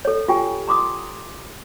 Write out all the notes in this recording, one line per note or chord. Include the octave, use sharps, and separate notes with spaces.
A4 C#5
F4 G4 G5 G#5
A#5 C6 D6 D#6